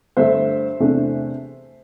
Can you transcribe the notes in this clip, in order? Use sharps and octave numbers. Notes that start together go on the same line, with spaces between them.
G2 D3 A3 C5 E5
E2 C3 A3 D4